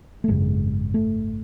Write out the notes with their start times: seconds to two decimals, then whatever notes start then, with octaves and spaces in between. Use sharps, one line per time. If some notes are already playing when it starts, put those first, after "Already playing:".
0.24 A3
0.28 G#1 F#2 C#3 G#3
0.94 A3